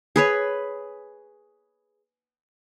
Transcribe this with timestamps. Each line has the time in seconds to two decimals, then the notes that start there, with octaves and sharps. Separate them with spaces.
0.16 G#4 B4 C#5